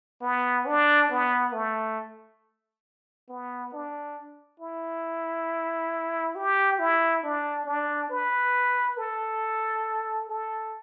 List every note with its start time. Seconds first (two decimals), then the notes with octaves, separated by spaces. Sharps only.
0.22 B3
0.66 D4
1.11 B3
1.53 A3
3.29 B3
3.73 D4
4.60 E4
6.36 G4
6.79 E4
7.23 D4
7.66 D4
8.10 B4
8.98 A4
10.30 A4